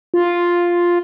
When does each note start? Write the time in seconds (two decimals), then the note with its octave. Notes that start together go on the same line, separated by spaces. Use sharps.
0.14 F4